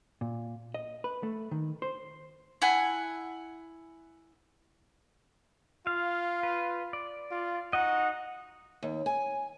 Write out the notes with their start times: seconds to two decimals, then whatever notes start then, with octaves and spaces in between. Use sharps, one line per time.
0.21 A#2
0.74 D#5
1.04 B4
1.23 A3
1.51 D#3
1.82 C5
2.62 E4 F#5 G#5
5.87 F4 F5
6.43 B4
6.93 D5
7.31 F4
7.73 D#4 F#4 D#5 F#5
8.83 D#2
9.06 G#5